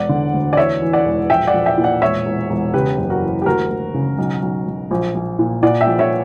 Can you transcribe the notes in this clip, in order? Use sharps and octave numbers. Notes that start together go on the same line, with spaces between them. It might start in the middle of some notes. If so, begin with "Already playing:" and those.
Already playing: E1 D5 F#5
D3
D2
D5
E2 C#5 E5
E3
D5 F#5
E1
A#1 E5 G5
D5 F#5
A#1
E5 G5
A#2
D5 F#5
E1 C#5 E5
E1
E1
C#3 G4 B4
F#1
F#4 A#4
E2
G4
D2 F#4 A#4
D2
C#3
B1
B1
B1
A#1
A#1
A#2
A#2 D5 F#5
E5 G5
A#1
C#5 E5